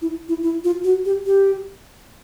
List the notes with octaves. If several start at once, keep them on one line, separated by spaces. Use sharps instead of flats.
E4
E4
E4
F4
F#4
G4
G4